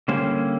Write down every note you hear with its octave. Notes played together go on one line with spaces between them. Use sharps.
D3 G3 A#3 C#4 C5